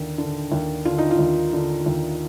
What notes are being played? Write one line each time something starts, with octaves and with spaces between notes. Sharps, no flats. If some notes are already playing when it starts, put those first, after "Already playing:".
Already playing: D#2 D3
D3
D#2
D3 F4
D#4
F4
D#2
D3
D#2